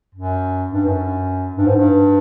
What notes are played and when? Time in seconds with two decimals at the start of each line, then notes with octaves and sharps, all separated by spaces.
0.15 F#2
0.72 G2
0.86 F#2
1.58 G2
1.67 G#2
1.76 G2